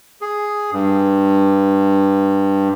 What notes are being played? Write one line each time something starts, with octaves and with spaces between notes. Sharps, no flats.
G#4
G2